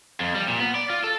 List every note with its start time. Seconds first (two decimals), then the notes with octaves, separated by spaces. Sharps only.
0.20 F2
0.35 G3
0.48 A#2
0.60 B3
0.75 D5
0.90 F4
1.04 A4